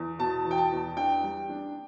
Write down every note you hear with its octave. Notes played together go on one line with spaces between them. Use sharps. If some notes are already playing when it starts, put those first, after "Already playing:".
Already playing: E2
B2 A5
E2
G5
A5
E2
D4 G5
G3
D4